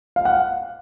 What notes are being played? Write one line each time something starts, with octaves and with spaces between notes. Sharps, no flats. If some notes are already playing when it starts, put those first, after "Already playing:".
F5
F#5